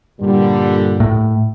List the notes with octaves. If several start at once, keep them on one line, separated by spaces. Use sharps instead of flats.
G2 A#2 D3 G3
A2